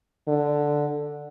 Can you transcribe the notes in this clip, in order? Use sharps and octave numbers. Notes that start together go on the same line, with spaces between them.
D3